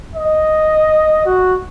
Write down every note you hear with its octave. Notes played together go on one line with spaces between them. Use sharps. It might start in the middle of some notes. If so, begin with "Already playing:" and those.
D#5
F#4